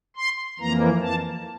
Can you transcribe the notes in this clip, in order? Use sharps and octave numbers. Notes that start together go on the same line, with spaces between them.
C6
F2 E3 A#3 A#5
A5